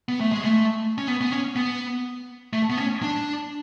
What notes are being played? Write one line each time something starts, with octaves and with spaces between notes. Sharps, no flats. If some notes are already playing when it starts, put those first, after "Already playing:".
B3
A3
G#3
A3
C#4
B3
B3
C#4
B3
A3
B3
C#4
D4